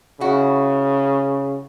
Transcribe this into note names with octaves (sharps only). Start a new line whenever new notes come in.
C#3 E4 F#4